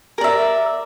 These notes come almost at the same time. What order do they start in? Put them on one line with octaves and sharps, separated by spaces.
A#4 D5 E5